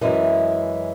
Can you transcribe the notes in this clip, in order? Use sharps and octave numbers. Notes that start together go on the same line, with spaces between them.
F#2 E3 G#3 E4